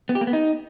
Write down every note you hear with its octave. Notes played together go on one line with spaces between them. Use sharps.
B3
G4
A#3
B3
D#4